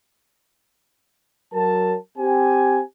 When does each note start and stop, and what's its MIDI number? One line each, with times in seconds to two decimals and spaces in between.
1.53 1.95 54
1.53 1.95 70
1.53 1.95 81
2.18 2.81 60
2.18 2.81 67
2.18 2.81 80